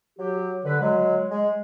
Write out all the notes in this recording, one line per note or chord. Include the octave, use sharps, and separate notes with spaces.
F#3 G4
D3 B4
F#3 G#3
G#3